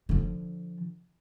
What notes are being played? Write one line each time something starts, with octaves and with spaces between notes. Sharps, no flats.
D3 F3